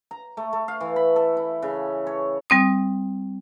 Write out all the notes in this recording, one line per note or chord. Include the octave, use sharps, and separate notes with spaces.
A#5
A3
A3
F5
E3
B5
A4
E4
C#3
C#5
G3 C4 D#6